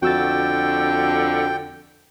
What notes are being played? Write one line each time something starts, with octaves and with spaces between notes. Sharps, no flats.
F2 D3 F#4 G5 E6 A6